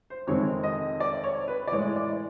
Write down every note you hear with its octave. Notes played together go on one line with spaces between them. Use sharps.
C5
F2 C3 D#3 G#3 C4 C#5
D#5
D5
C#5
B4
D5
A2 E3 G#3 C#5
D5